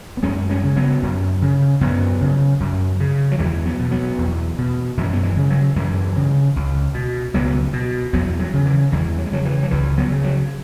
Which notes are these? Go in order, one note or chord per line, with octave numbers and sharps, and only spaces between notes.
B3
F#2 G#3 C#4
G#3 C#4
C#3
F#3 B3
F#2
C#3
F#2 F#3 B3
C#3
F#2
C#3
F#3
E2 E3 G#3
F#3 B3
B2
F#3 B3
E2
B2
F#2 E3 G#3
B3
E3 G#3
C#3
F#3
F#2 E3 G#3
C#3
C#2
B2
C#2 F#3 B3
B2
E2 F#3 B3
F#3
C#3
E3
E2 E3 G#3
F#3
G#3
C#3 F#3
E3
F#3
C#2 E3
F#3 B3
C#3
F#3